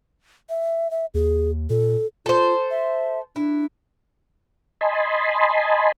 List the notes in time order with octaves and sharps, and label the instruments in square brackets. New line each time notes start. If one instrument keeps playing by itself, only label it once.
[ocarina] E5
E5
[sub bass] D#2 [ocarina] G#4
[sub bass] A#2 [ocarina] A4
[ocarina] F4 [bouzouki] A4 C5
[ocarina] E5
[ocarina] D4 [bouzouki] E4
[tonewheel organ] D#5 G#5 A5 B5 C6